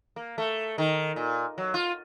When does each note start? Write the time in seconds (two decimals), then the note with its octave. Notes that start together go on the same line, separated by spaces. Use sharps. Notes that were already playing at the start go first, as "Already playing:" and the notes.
0.16 A#3
0.38 A3
0.78 D#3
1.16 A#2
1.58 F#3
1.74 F4